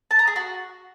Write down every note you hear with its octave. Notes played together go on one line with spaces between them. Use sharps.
A5
A#5
G#4
F#4